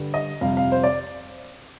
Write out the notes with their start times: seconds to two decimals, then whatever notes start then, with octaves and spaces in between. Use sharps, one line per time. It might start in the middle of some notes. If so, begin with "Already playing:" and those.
Already playing: G2 D3 G3
0.14 D#5
0.41 F2 C3 G3 F5
0.57 F5
0.72 C5
0.84 D5